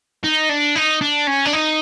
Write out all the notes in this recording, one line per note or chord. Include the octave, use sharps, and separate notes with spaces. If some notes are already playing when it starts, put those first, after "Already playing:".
D#4
D4
D#4
D4
C#4
D4
D#4